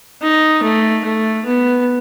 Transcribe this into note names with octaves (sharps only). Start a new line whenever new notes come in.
D#4
A3
A3
B3